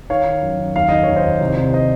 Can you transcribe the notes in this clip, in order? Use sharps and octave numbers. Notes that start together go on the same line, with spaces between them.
D#3 C#5 F5
D#3
F#2
F#2
D#2 F5
D#3 D#5
D#2 C#5
C5 D#5
D#2
C2
C2
C5 D#5